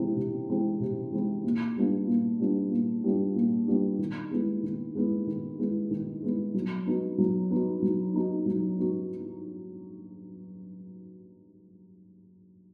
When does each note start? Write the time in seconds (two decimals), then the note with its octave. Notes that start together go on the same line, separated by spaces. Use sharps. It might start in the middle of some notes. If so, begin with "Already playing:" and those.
Already playing: C3 E3 G#3 C4 E4
0.16 C3
0.49 E3 G#3 C4 E4
0.80 C3
1.12 E3 G#3 C4 E4
1.44 A#2
1.76 G3 B3 D4 F4
2.08 A#2
2.40 G3 B3 D4 F4
2.71 A#2
3.04 G3 B3 D4 F4
3.36 A#2
3.67 G3 B3 D4 F4
3.99 D#3
4.31 G#3 B3 E4
4.63 D#3
4.95 G#3 B3 E4
5.27 D#3
5.59 G#3 B3 E4
5.91 D#3
6.22 G#3 B3 E4
6.54 F#3
6.87 B3 D#4 F#4
7.18 F#3
7.50 B3 D#4 F#4
7.82 F#3
8.14 B3 D#4 F#4
8.46 F#3
8.78 B3 D#4 F#4